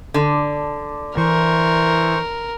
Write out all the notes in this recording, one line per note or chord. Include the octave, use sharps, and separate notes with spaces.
D3
E3 A#4 C5 C#6